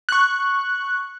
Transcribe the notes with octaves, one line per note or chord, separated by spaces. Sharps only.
C#6 F#6